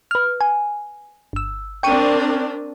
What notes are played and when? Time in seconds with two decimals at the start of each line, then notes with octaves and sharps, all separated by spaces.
0.11 B4 F6
0.41 G#5
1.33 G1 E6
1.83 C4 D4 A#4 G5 C#6 D#7